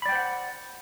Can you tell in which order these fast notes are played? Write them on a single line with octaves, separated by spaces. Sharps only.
B5 D5 G5 C5 F#5